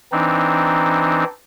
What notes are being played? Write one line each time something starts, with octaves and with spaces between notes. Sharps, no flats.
E3 C4 D4 D#4